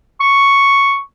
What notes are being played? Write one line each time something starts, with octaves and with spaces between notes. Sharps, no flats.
C#6